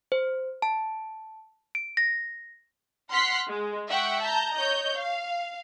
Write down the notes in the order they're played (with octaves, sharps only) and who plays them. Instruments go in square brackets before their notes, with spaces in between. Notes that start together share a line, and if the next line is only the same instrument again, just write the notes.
[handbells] C5
A5
D7
A#6
[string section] F#5 C6 F6 F#6 B6 C7
G#3
E5 F#5 G5 C#6
A5 A#5 G6
C#5 D#5 G6
F5